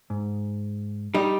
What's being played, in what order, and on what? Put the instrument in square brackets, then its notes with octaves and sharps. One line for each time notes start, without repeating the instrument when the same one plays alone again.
[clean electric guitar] G#2
[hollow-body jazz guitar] G3 D#4